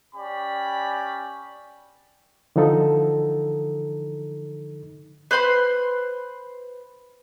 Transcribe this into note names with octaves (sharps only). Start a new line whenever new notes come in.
C#4 G4 D5 B5
D3 E3 F3 D#4 A4
B4 C5 B5 C6